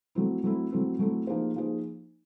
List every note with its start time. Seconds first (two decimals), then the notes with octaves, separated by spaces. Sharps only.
0.15 F#3 A3 C4 E4
0.44 F#3 A3 C4 E4
0.71 F#3 A3 C4 E4
0.99 F#3 A3 C4 E4
1.27 F3 A#3 D#4 G#4 C5
1.56 F3 A#3 D#4 G#4 C5